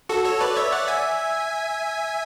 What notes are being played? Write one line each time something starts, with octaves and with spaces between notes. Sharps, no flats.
F#4 A4
A4 C#5
B4 D5
C#5 E5
D5 F#5
E5 G#5